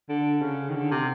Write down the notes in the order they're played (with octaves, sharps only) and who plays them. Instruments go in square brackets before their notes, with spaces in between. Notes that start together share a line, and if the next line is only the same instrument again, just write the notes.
[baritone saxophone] D3
C#3
D#3
D3
C3